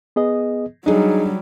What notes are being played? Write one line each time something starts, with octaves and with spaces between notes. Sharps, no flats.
B3 G#4 D#5
F#3 G3 D4 D#4 G#4